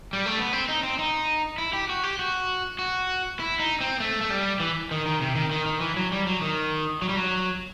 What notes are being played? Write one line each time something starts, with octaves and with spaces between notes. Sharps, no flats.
G3
A3
B3
C4
D#4
C4
D#4
E4
G4
F#4
G4
F#4
F#4
E4
D#4
C4
A3
A3
G3
E3
D#3
D#3
C3
D#3
D#3
D#3
E3
F#3
G3
F#3
D#3
F#3
G3
F#3